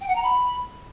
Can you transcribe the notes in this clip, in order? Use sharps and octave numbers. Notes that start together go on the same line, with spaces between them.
G5
F#5
A#5
B5